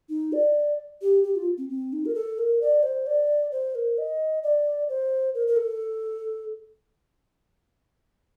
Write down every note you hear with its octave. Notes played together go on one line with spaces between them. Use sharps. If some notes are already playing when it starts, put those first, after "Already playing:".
D#4
D5
G4
G4
F4
C4
C4
D#4
A#4
A4
A#4
D5
C5
D5
C5
A#4
D#5
D5
C5
A#4
A#4
A4